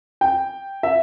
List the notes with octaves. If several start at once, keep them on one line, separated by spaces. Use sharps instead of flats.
G5
E5